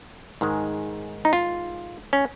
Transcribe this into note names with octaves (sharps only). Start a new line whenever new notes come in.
G#2 D#3 G#3
D#4
F4
C#4